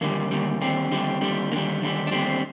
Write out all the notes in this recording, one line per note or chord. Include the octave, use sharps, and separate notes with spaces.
D#2 D3 G3 A#3
D#2 D3 G3
D#2 D3 G3 C4
D#2 D3 G3
D#2 D3 G3
D#2 D3 G3 A#3
D#2 D3 G3
D4
D#2 D3 G3 C4
C4